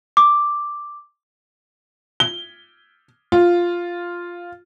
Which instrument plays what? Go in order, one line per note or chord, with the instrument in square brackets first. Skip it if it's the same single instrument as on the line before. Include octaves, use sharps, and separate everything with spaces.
[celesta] D6
[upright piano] G7
F4